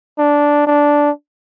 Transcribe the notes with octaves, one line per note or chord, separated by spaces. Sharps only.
D4
D4